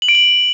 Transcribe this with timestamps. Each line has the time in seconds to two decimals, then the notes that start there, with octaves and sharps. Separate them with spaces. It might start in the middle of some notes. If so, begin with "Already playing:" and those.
0.02 F#7
0.08 D7
0.15 F#7